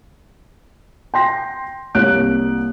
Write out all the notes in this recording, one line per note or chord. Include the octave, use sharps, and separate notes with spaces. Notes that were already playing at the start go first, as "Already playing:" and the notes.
G5 C6 A#6
C2 A#3 C#5 F#6 D7